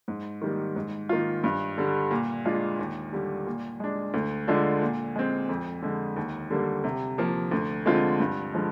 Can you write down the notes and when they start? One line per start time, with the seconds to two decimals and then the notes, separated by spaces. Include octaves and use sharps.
0.08 G#2
0.41 D#3 G3 A#3
0.76 G#2
1.09 D#3 A#3 F4
1.44 G2
1.77 D3 G3
2.11 A#2
2.45 G#3 D4 F4
2.79 D#2
3.12 D3 G3
3.46 A#2
3.80 G#3 D4
4.14 D2
4.47 D3 G#3 D4 F4
4.82 A#2
5.15 G#3 C4
5.49 F2
5.82 D3 G#3
6.16 D#2
6.50 D3 G3 A#3
6.84 C3
7.18 F3 A#3
7.51 D2
7.86 D3 G#3 C4 F4
8.20 G2
8.54 D3 F3 G#3